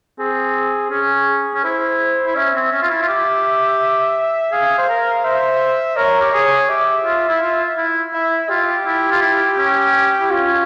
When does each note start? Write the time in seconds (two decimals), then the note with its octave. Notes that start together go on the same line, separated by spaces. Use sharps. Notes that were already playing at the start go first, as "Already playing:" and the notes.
0.19 C4 G#4
0.91 C#4 G#4
1.54 C#4
1.63 E4 C5
2.26 E4
2.35 C#4 E5
2.54 C4
2.71 C#4
2.82 F4
2.90 E4
3.02 F4
3.08 G4
4.52 G#4 F5
4.78 C5
4.89 A#4
5.24 C5 E5
5.97 A#4 C#5
6.21 G4
6.32 G#4 C#5
6.69 G4 E5
7.04 F4
7.29 E4
7.41 F4
7.77 E4
8.13 E4 E5
8.50 F4 G4
8.86 E4
9.11 F4
9.21 E4
9.58 C#4
10.21 E4
10.30 C#4 F4